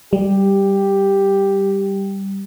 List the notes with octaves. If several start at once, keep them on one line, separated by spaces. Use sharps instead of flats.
G3 G4